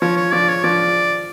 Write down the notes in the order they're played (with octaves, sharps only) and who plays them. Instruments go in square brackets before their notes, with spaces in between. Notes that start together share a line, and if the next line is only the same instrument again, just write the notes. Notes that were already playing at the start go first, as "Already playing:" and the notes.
[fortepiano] F3 [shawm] C#5
[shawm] C#5
[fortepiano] F3 [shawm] D5
[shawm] C#5
[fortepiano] F3 [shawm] D5